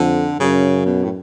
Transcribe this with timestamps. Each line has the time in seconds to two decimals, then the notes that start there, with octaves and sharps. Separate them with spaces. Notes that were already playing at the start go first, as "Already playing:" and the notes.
Already playing: F2 D3
0.40 F#2 C#3
0.86 B2
1.04 A2